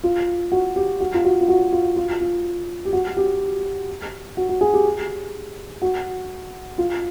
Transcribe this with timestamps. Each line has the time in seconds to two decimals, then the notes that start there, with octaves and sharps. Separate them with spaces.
0.04 F4
0.52 F#4
0.76 G4
1.00 F#4
1.14 F4
1.24 F#4
1.41 F4
1.48 F#4
1.72 F4
1.96 F4
2.21 F4
2.85 G4
2.93 F#4
3.17 G4
4.37 F#4
4.49 F#4
4.61 G#4
4.74 G4
5.82 F#4
6.78 F4